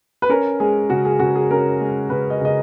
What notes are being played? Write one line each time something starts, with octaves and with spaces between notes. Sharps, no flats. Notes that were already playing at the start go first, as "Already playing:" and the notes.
B4
C#4 A#4
G#3 G#4
C#3 F#4
G#4
C#3 F#4
G#4
C#4 A#4
G#3
C#3 B4
D#5
C#3 D#5